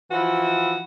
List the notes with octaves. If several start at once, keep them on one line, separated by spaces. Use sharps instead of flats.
E3 F3 E4 F#4